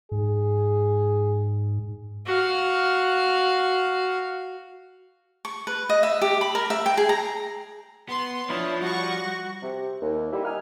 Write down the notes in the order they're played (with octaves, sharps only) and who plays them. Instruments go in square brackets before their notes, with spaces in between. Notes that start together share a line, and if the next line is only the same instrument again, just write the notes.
[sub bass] G#2 [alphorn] G#4
[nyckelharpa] F#4 F5
[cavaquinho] C#6
B4
D#5
E5
G4
B5
A#4
E5
G5
G#4
A#5
[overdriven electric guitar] B3 [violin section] C6
[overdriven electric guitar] F3 [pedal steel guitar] D4 E4 [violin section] C#5 [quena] D#6
[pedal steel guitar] G3 [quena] F#4 [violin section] F#5 C#6
[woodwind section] C3
D#2
D3 G3 D#4 E4 G4
D#5 F#5 G#5 A#5 F6